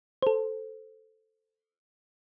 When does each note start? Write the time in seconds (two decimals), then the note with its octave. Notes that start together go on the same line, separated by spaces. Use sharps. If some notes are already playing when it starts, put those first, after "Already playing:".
0.22 A4 C5